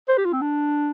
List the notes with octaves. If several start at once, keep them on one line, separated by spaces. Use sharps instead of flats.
C5
G4
F4
C4
D4